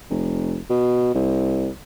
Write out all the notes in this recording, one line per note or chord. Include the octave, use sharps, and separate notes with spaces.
F1
B2
C2